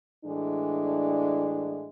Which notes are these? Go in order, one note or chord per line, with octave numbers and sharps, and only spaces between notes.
A2 E3 G#3 D4